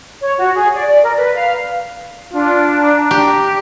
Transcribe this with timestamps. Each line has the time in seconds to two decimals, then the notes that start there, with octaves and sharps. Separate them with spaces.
0.21 C#5
0.39 F#4
0.54 G#4
0.75 D5
0.88 D5
1.03 A#4
1.17 B4
1.35 F5
2.33 D4 F4
2.79 A#5
3.11 G4